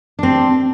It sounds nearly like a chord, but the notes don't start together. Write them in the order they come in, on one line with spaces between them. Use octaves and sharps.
D4 C4 G4